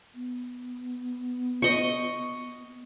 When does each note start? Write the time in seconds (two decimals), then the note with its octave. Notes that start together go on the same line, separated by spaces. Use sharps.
0.15 B3
1.62 D#5 C#6